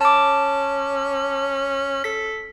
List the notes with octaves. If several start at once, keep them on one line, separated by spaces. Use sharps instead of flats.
C#4 A5 D6
A4 B6